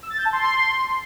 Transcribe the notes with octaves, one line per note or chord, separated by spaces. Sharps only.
E6
A6
G6
A5
C6